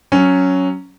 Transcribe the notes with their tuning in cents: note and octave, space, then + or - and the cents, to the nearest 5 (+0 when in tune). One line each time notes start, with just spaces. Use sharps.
F#3 +0 C#4 +0